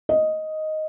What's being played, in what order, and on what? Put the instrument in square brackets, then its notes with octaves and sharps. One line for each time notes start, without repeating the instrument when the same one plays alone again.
[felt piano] D#5